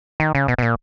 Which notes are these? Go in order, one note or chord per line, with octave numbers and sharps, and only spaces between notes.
D#3
C#3
B2
B2
A#2